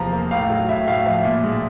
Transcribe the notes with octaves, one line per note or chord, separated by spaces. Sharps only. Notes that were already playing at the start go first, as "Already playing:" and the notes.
Already playing: E2 C3 F3 A#5
A#3
A2 F5
F#3
A2 E5
A2 F5
F3 E5
A#2
G#3